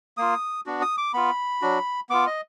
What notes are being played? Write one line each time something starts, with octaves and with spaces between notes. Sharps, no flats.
A#3 F4 D#6
B3 D4 F#4
D#6
D6
B3 F4 B5
F#3 D4 F#4
B3 F4 D6
D#5